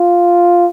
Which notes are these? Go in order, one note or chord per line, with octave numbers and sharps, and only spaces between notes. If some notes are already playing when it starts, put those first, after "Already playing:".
Already playing: F4